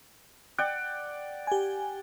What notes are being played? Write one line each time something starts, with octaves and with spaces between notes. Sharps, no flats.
D5 F#5 G5
G4 G#5